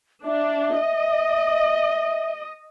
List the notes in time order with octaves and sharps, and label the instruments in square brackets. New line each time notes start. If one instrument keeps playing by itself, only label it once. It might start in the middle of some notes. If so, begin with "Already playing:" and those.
[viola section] D4 [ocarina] E5
[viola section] D#5